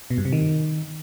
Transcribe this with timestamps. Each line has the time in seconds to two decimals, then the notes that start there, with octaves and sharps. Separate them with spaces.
0.10 B2
0.18 G2
0.25 C3
0.32 D#3